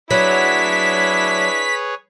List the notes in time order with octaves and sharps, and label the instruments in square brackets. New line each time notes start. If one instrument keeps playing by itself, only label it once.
[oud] F#3 [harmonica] D4 E4 [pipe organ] G#4 B4 C#5 [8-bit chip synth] B6